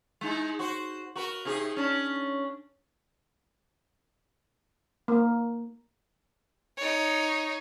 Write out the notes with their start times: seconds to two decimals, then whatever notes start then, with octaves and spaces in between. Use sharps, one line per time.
0.21 G#3 D#4 E4
0.59 F#4 C5
1.16 F#4 A#4 B4
1.45 C3 D#4 G#4
1.76 C#4 D4
5.08 A#3
6.77 D#4 C#5